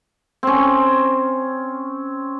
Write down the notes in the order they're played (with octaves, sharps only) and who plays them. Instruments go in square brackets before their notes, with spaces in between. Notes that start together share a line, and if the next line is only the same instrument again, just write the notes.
[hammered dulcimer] C4 C#4